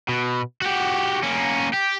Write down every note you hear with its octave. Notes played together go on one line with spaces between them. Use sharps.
B2
F#4 G4
A#3 C#4
G4